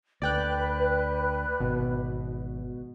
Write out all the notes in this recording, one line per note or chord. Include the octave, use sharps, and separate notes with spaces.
D2 B4 D5 G5 F#6
G#1 B2